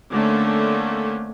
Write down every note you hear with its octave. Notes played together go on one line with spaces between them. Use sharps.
D3 A3 A#3 C4 C#4